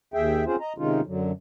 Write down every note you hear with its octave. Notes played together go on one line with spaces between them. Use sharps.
D#2 G#4 E5 G5
C4 C#4 F4 G#4 C5
D#5 A#5
C3 D#3 G#3 C#4 D#4 F4
F#2 D3 F#3